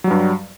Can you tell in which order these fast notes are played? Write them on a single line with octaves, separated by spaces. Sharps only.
F#3 G3 G2